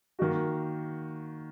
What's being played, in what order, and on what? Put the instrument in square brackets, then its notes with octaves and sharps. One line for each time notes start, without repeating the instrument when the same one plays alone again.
[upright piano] D#3 A#3 D#4 F#4